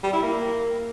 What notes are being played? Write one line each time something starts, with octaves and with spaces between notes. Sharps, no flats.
G3
E4
A#3